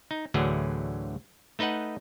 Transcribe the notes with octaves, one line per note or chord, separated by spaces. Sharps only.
D#4
D2 A2 D3 E3 F#3 G#4
A3 D#4 B4 D#5 F#5